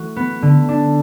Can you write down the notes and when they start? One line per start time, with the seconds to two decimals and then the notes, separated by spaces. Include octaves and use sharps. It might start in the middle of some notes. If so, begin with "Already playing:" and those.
Already playing: E3 A3 F#4
0.16 B3
0.42 D3
0.69 D4